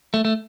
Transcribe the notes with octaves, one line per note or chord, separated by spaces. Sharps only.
A3
A3